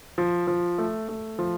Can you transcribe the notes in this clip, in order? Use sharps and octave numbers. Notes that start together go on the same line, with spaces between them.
F3
F3
A3
A3
F3